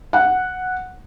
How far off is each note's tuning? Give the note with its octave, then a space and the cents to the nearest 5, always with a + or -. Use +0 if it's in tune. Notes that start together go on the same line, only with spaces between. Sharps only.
F#5 -5